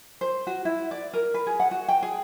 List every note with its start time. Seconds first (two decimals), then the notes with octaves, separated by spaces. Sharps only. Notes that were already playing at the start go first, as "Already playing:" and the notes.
0.21 C5
0.47 F#4
0.65 E4
0.91 D5
1.14 A#4
1.34 B4
1.47 G#4
1.60 F#5
1.71 F#4
1.88 G5
2.03 G#4